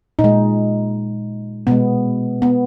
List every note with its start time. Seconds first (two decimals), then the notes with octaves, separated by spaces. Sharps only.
0.19 A#2 D#4
0.24 G#3
1.67 B2 G#3 B3
2.42 B3